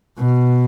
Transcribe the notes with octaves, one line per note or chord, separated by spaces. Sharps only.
B2